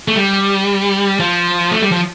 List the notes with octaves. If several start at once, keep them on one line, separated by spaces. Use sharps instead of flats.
A3
G3
F3
A3
G3
F3